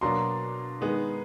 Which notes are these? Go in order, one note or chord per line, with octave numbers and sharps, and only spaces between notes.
B2 F#3 A#3 D4 A#5 C6
D#3 G#3 B3